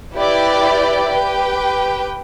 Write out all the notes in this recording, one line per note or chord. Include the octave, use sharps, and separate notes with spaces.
E4 G4 B4 D5 G5
G4 B4 G5